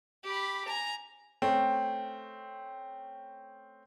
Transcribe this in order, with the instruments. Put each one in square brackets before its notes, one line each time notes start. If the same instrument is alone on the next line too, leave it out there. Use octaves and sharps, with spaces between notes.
[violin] G4 B5
G#5 A#5
[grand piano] A3 C4 C#4